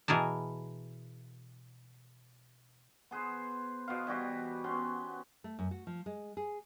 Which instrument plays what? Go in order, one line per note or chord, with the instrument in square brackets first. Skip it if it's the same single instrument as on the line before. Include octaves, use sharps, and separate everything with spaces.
[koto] B2 E3 G#4 A#4 A5
[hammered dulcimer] B3 G#4 B4 C5
B2 B3 F5
E3 G3 F#4 G4
B3 C#4 C6
[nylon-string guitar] A3
F#2
F#4
F3
G#3
G#4